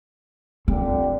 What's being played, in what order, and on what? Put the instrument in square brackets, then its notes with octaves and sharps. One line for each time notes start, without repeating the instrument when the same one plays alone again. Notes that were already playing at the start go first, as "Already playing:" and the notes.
[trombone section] A#2 D3 G4 [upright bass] C4